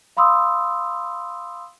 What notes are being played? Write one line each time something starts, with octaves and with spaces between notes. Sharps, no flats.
F5 B5 C6 D#6 E6